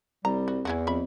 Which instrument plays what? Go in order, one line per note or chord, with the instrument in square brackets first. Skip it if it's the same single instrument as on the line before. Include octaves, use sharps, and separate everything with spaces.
[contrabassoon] C2 [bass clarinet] G3 [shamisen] A#5
[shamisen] F#4
[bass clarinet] E2 [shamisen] E3 E4 F#4
[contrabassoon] F2 [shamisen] E5 B5